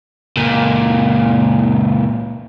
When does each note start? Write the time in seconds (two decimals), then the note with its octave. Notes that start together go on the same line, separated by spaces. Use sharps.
0.37 C#2 A#2